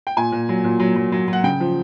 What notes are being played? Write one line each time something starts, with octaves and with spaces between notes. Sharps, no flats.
G5
A#2 G#5
A#2
F#3
A#2
F#3
F#3
F#3
F#3 F#5
C#3 G5
F3